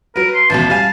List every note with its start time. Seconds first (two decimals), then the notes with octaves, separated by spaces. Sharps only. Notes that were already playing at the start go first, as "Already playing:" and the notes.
0.16 F#3 A#4 B4
0.34 C6
0.50 A1 D#2 B2 A5
0.70 G3 F5 G#5